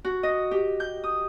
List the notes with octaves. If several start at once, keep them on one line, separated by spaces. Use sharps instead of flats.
F#4
D#5
G4
G6
D#6